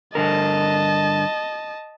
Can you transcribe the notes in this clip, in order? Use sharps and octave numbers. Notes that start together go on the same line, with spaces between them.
G2 D3 A#4 D#5 A5